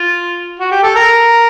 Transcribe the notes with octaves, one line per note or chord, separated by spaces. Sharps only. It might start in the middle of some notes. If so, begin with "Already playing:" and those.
Already playing: F4
F#4
G4
A4
A#4